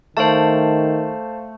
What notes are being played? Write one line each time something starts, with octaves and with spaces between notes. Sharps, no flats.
D#3 A3 C5 F5 A5